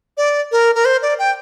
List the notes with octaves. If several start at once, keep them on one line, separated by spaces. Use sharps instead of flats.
D5
A#4
A#4
C5
D5
G5